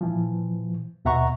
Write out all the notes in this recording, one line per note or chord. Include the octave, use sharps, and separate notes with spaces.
A#2 E3 F3
D#2 B2 E5 F#5 A#5 C#6